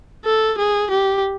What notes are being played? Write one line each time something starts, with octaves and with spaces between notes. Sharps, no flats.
A4
G#4
G4